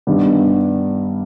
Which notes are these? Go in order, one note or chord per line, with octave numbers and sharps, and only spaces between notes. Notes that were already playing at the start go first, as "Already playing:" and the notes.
G2 D#3 G3 B3